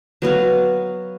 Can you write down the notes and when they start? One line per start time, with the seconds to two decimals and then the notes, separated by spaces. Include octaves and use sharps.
0.22 F#3 B3 F#4 F5